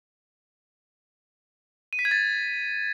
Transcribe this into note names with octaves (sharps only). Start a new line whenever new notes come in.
D#7
B6
G#6
A6